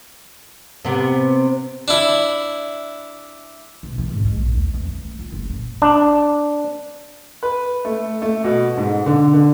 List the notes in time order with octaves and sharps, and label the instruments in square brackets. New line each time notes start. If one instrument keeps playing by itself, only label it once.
[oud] C3 B3
[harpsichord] D4 E4
[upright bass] B2
E3
G#2
G#3
A#1
D#2
E2
A3
F4
F#1
A#2
[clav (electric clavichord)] D4
[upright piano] B4
A3
A3
B2
G#2
D3
D3